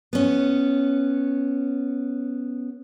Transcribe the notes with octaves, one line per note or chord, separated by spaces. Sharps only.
B3 C#4